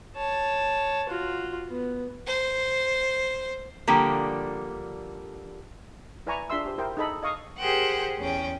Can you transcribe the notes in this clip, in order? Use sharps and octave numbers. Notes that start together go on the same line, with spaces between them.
C#5 A5
F4 F#4
B3
C5
D3 F3 G3 A#3
E4 B4 D5 G#5 A#5 C#6
D4 F4 G#4 E5 C6 E6
G4 C5
E4 A#4 C5 G5
D#4 G#4 A4 D#5 B5
D#5 F5 C#6 D#6
G4 G#4 A#4 C5 F#5 G5
E2 C#4 G5